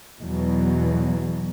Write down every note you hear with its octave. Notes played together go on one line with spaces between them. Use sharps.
E2 B2 F#3